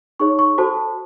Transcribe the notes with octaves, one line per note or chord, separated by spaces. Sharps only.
D#4 G#4 C#5 C#6
C#6
F#4 A4 C5 A5